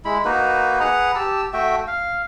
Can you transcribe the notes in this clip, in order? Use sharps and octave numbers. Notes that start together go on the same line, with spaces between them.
G#3 E4 B5
A#3 D#4 F#4 B4
G#4 B4 F#5 A#5
G4 A5 E6
A3 F#4 E5 G5
F5